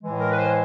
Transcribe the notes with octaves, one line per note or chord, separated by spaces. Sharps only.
A2 E3 G#3
A#4
B4
C5